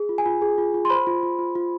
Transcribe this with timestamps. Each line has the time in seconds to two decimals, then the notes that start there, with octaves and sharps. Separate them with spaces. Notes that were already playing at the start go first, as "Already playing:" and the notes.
Already playing: G#4
0.09 F4
0.18 G#5
0.26 F4
0.42 G#4
0.58 F4
0.74 F4
0.85 C6
0.90 C5 B5
1.07 F4
1.23 F4
1.39 F4
1.55 F4